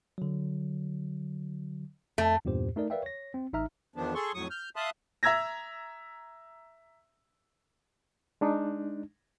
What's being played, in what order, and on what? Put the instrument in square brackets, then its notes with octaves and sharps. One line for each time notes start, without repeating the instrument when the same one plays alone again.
[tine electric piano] D3 F#3
[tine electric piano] F2 [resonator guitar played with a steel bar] A3
[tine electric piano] E2 G2 A#2 G4 C5
A3 D#4 A#4 D5
A#4 B4 D5 E5 F5 G5
C#5 A#6
C4
A1 D#4 E5 A#5 F6
[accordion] E2 D#3 F3 B3 D4
G#4 A4 C6 C#6
F2 A2 F#3 C#6 D#6
F6 G6
E5 F5 A5 C6 D#6 F#6
[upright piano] E5 A#5 E6 G#6 A#6
[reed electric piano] G#3 D4 D#4